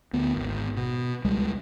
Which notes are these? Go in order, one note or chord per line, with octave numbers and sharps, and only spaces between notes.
D2 B3
G#1
B2
C#2 G3 G#3